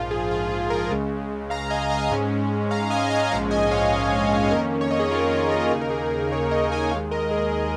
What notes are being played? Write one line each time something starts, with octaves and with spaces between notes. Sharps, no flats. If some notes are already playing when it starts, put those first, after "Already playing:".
Already playing: A#1 G#2 F3 F4
G#4
F4
G#4
F4 A#4
C#2 C#3 G#3
F5 A#5
D#5 G#5
D#5 G#5
G#2 G#3 C#4
F5 A#5
D#5 G#5
D#5 G#5
A#1 G#2 F3 G#3 C#4 F5 A#5
D#5 G#5
C#5 F5
F2 D#3 A#3 C#4 A#4 D#5
C#5
D#5
G#4 C#5
F4 A#4
G#4 C#5
A#4 D#5
D#2 C#3 A#3 D#4 G#4
A#4
G#4
G#4 C#5
A#4 D#5
D#5 G#5
D#2 D#3 G#3 C#5 F5
A#4 D#5
G#4